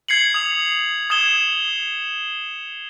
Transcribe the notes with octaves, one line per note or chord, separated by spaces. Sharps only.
G#6 C7 C#7 F#7
D#6 F7
D#6 G#6 E7 G7